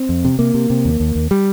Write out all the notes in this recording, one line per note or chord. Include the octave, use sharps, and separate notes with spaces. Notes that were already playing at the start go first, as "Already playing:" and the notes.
Already playing: C4
F2
C3
C3 A#3
C3
C3
D#2
D#2
D#2
G3